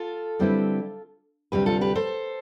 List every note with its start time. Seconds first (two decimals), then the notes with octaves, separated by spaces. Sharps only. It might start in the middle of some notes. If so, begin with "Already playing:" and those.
Already playing: F4 A4
0.39 D3 G3 C4 E4 B4
1.52 D2 C3 G3 G4 B4
1.66 F4 A4
1.81 G4 B4
1.95 A4 C5